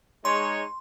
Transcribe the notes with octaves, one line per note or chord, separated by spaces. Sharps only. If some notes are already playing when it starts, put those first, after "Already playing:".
G#3 D#4 C#5 C6